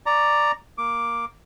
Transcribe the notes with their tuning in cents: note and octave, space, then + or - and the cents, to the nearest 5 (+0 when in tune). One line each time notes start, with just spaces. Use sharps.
D5 +5 A#5 +0 C#6 +25
A#3 +0 D6 +0